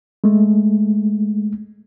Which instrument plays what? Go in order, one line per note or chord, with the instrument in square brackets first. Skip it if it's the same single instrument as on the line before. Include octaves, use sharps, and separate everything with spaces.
[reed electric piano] G#3 A3